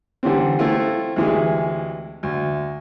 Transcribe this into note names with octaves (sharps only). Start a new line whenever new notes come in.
D3 E3 G3 C4
A3 C4 E4 F4
D2 C3 E3 G#3 G#4
D2